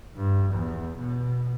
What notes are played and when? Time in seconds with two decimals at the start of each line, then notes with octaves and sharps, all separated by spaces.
0.17 G2
0.53 E2
0.97 B2